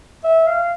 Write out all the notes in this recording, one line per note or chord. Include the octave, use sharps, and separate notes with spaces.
E5
F5